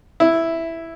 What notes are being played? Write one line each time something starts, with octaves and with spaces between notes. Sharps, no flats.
E4